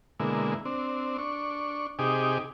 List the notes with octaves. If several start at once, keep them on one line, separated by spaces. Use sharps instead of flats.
B2 D3 G#3 A#3 E4
C4 D4
D4 C#6
C3 D#4 G4 G#4 D6